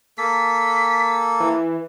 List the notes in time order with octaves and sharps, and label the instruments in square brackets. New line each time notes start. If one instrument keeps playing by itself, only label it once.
[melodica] A#3 A4 [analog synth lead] B6
[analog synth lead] E3